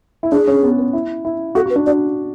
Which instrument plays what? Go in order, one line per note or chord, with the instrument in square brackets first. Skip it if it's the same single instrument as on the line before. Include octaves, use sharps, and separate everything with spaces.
[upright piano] E4
[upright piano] D4 [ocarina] G#4
[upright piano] C#4
B3
B3
E4
E4
[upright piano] F#4 [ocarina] A4
[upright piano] F#4
[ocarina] B4
[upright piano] D4
[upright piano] F#4 [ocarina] D5